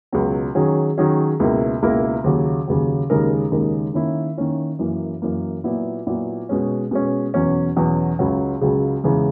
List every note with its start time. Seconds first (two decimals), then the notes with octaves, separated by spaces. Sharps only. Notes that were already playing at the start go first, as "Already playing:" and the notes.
0.13 C#2 B2 F#3
0.55 D#3 F#3 C#4 G#4
0.98 D#3 F#3 C#4 G#4
1.40 C#2 B2 A#3 E4 A#4
1.82 C#2 B2 A#3 E4 A#4
2.24 D#2 C#3 F#3
2.67 D#2 C#3 F#3
3.10 D#2 C#3 G#3 D#4 A#4
3.52 D#2 C#3 G#3 D#4 A#4
3.94 D#3 A#3 C#4 E4
4.37 D#3 A#3 C#4 E4
4.79 F#2 E3 A#3
5.22 F#2 E3 A#3
5.64 A#2 F#3 B3 E4
6.07 A#2 F#3 B3 E4
6.49 B2 G#3 C#4
6.91 B2 G#3 C#4
7.34 E2 B2 F#3 C#4
7.76 E2 B2 F#3 C#4
8.19 C#2 C#3 F#3
8.61 C#2 C#3 F#3
9.04 E2 C#3 E3 G#3